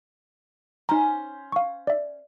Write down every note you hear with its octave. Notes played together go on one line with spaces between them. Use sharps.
C#4 D#4 C5 A#5
F5 C#6
D5 E5